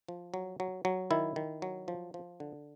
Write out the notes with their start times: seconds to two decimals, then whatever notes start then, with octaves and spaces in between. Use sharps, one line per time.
0.08 F3
0.34 F#3
0.60 F#3
0.85 F#3
1.11 D#3 E4
1.36 D#3
1.62 F#3
1.88 F3
2.14 F3
2.40 D3